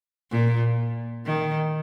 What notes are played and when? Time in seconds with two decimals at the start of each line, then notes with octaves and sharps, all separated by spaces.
0.31 A#2
1.26 D#3